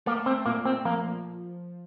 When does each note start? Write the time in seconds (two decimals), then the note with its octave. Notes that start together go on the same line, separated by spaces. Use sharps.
0.06 A3 A#3
0.26 C4
0.46 A#2 A#3
0.65 C4
0.85 F3 A#3